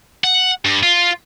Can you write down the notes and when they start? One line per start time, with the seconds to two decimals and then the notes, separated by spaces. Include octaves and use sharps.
0.24 F#5
0.65 G2
0.83 F4